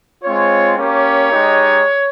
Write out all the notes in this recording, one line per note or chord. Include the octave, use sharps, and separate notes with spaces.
G#3 C4 F4 C#5
A#3 C#4 G4 C#5
G#3 D#4 G4